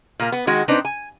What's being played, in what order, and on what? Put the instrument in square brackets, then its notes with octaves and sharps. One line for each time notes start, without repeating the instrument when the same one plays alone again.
[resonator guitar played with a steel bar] A#2 A#3
B3
D#3 G#3 F#4
C4 D4 D#4 B4 C5
G#5